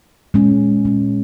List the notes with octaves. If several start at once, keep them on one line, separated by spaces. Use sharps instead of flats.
A#2 G#3 C#4
A#2 G#3 C#4